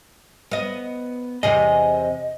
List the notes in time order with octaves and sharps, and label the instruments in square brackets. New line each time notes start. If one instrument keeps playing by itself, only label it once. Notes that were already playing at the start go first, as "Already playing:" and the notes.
[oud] B3 D#5
[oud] E2 C3 G#4 [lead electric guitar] D#5